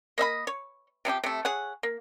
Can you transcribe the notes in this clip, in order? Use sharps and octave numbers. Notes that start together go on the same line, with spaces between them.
A#3 D#5 E5 B5
C#5
C3 F3 D#4 G4
C3 A3
G#4 C#5 F#5
A#3